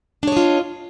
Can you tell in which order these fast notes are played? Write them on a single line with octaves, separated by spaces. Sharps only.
D4 C#5 D#5 F4